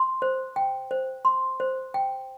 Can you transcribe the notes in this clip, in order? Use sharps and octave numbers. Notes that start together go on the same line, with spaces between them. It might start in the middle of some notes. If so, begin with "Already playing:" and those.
Already playing: C6
C5
G5
C5
C6
C5
G5